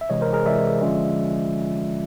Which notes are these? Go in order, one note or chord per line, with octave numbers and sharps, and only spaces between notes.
E5
C3 E3 G#3 C#5 D#5
A#4 C5
G#4 A#4
C3 E3 G#3 D5 E5
D3 F3 G#3 C#4 F4